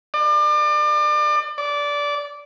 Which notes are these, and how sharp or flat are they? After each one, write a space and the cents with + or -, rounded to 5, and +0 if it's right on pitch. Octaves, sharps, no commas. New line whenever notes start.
D5 +35
D5 -15